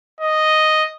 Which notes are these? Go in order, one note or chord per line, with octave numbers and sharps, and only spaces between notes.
D#5